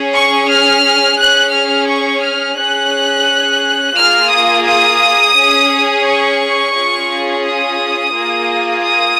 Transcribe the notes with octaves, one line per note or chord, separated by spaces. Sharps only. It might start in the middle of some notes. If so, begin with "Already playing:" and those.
Already playing: C#4 G#4
C#6
F6
C#4 G#4 F#6
F6
C#6
F6
C#4 G#4 F#6
A#3 F4 G#4 F6
D#6
D#6
C#4 G#4
C#6
C#4 F4 G#4
D#6
A#3 F4 G#4
D#6